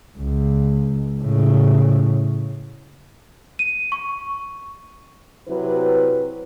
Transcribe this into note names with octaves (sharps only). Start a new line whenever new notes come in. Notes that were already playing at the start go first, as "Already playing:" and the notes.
C#2
A2 C#3
D#7
C#6
C3 F#3 E4 B4